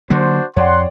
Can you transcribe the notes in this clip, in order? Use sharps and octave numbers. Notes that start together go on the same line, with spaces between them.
D3 F#3 A#3 D4 F#4 C5
F2 C#5 D5 F#5 G5 C6